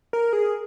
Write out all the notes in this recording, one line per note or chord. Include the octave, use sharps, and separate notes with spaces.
A#4
G#4